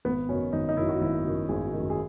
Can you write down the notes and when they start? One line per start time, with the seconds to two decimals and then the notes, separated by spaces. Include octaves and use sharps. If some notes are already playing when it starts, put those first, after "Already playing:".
0.05 G#1 B3
0.28 F#2 C#4
0.32 D#3
0.53 G#1 D#4
0.69 D#4
0.77 D#3 E4
0.80 F#2
0.89 F#4
1.01 G#1 E4
1.25 F#2 D#3
1.49 G#1 G#4
1.73 F#2 D#3
1.90 G#4